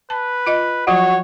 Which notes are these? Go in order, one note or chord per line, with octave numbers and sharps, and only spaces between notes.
B4 A5
F4 D#5
F3 F#3 F4 F#4 C#5